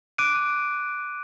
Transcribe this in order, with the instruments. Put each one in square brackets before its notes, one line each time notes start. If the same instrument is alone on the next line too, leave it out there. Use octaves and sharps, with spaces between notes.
[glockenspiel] D6 F#6 D7 D#7